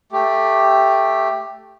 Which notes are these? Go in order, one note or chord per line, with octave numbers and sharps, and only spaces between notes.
A3 G4